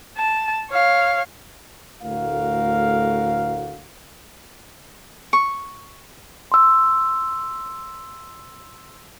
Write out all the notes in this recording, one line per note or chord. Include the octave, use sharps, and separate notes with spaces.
A5
C#5 F5
D2 A2 F#4 A#4 F5
C#6
C6 E6